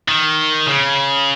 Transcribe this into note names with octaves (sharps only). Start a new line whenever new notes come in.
D#3
C#3